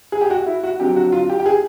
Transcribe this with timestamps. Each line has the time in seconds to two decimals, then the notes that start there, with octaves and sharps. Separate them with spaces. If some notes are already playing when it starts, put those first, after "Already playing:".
0.12 G#4
0.21 G4
0.30 F#4
0.46 E4
0.63 F#4
0.80 F2 D3 F#3 G4
0.96 F#4
1.12 F4
1.30 G4
1.40 G4
1.46 G#4